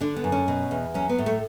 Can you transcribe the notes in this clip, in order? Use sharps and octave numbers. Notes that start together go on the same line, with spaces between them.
D3 D4
B3
F#2
C#4
B2
E2
F#3 C#4
B3
A2
A3